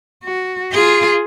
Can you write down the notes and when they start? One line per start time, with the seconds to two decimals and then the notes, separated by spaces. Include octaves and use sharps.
0.24 F#4
0.72 F4 G#4